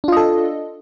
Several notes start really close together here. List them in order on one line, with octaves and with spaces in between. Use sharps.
D4 F4 D#5 A4